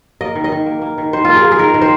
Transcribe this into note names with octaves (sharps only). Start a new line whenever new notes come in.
A#3 D#5
D#3
D#5
D#3
A#3
A#3
D#3
D#3 C5
A#3 F4
G#4
A#3
G#4
D#3 A#4
D#3
C5